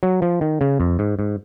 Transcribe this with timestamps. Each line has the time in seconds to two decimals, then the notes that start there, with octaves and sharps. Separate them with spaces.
0.03 F#3
0.22 F3
0.41 D#3
0.61 C#3
0.80 F2
0.99 G#2
1.19 G#2